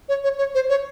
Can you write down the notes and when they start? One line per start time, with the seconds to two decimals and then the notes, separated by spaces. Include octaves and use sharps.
0.09 C#5
0.24 C#5
0.39 C#5
0.55 C5
0.69 C#5